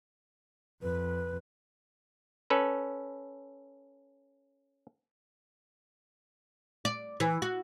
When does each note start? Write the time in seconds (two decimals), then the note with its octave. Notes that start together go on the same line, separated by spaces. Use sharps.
0.82 F2 B4
2.50 C#4 A4 B4
6.85 D5
7.20 E3
7.42 F#4